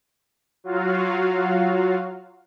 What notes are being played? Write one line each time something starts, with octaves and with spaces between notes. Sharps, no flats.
F#3 F4 F#4 F5